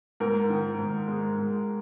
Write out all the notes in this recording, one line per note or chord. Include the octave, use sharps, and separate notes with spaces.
G#2 A#4
D#3
G#2
G#3
G#2